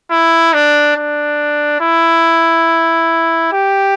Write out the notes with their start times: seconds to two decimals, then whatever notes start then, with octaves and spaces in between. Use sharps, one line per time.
0.11 E4
0.54 D4
0.96 D4
1.81 E4
3.52 G4